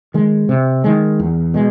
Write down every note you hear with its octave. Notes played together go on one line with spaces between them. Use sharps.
D#3 G#3
C3
D#3 G#3
E2
B2 G#3